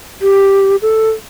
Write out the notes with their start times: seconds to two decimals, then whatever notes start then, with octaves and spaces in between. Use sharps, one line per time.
0.22 G4
0.82 A4